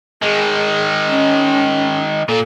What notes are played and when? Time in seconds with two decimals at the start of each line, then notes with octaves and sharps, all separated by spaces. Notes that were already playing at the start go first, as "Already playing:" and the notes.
0.22 D#3 G#3 G#4
1.07 C#4
2.29 A#2 A4